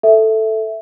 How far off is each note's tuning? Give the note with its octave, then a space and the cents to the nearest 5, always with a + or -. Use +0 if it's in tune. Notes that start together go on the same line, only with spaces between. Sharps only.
A4 +0 E5 +0